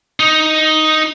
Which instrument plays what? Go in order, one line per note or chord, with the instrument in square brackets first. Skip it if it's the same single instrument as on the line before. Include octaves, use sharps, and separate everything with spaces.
[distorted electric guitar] D#4